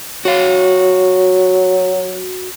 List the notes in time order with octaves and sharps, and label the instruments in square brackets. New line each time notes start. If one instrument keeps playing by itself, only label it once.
[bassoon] F#3 [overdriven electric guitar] F#4 F5